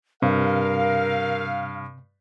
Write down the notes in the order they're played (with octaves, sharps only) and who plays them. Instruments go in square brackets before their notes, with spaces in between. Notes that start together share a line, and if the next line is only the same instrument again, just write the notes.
[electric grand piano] G2 [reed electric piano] C3 [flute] A#4 [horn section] F5